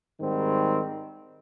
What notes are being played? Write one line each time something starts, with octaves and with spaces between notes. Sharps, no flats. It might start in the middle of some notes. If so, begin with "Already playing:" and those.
G#2 D#3 G3 C4